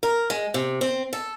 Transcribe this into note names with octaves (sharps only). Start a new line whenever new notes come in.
A#4
G#3
C3
C4
A4